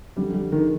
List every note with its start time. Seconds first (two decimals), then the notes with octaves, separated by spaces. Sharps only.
0.16 F2 D3 G3 G#3
0.34 G3
0.52 F2 D3 D#3 G#3